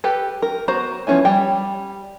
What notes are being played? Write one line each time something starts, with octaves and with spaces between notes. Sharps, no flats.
G4 A4 B4
A#4
B3 F#4 C5 A#5
F3 B3 C#4 E4 G#5
G3 G5